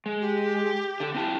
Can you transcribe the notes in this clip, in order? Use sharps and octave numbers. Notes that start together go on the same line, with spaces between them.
G#3
G4
D3 A4
C4 E4 A5